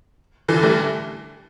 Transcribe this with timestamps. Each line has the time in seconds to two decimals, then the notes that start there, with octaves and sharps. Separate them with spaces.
0.48 D3 E3
0.63 G3 A3